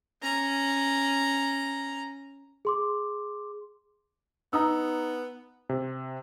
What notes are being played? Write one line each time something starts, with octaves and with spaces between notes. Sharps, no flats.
C#4 A#5
G#4 C6 D6
B3 D#4 A#5 D#6 E6
C3